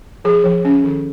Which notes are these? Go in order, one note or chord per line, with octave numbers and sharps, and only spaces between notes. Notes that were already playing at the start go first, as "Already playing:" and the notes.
F3 G#4
F3
C#4
D#3